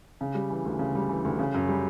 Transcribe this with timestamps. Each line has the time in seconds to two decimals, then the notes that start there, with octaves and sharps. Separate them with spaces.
0.21 C#3
0.35 G3
0.50 E3
0.65 D2
0.79 C#3
0.95 G3
1.09 E3
1.24 D2
1.39 C#3
1.54 F#2
1.69 G3